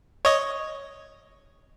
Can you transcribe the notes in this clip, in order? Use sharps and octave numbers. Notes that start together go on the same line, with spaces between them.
C#5 D#5